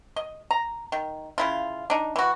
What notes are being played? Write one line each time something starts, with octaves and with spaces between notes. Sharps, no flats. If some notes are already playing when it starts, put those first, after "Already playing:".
D#5
A#5
D#3
C#3 E4 F4
D4 D#4
E3 F#4